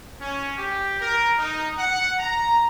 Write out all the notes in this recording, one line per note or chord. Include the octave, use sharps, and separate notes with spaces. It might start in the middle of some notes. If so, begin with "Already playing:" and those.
C#4
G4
A#4
D#4
F#5
A#5